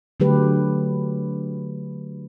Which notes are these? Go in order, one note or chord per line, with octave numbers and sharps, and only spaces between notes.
D3 F#3 A3 G4 B4